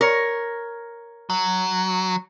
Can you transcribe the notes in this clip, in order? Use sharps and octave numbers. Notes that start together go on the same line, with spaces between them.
A#4 C#5
F#3